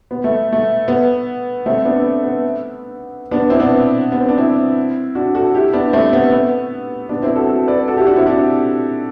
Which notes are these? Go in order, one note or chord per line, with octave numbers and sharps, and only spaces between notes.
B3
A3
A3
B3
A3 C4
B3 D4
B3
B3
B3 D4
C4 E4
B3 D4
B3
C4
D4
C4 E4
D4 F#4
F#4 A4
E4 G4
B3 D4
A3 C4
B3
B3
B3 D4
C4 E4
F#4 A4
F#4 A4
B4 D5
F#4 A4
E4 G4
D4 F#4
C4 E4
D4 F#4